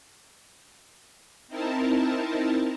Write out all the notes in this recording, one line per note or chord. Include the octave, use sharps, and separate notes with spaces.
C4 D#4 E4 A#4 A5